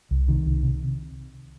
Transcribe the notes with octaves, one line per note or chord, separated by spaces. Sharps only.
C2
C3 D#3
C2
C3